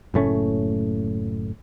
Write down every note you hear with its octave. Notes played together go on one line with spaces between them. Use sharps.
F#1 A2 A3 C#4